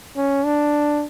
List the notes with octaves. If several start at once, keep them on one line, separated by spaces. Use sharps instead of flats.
C#4
D4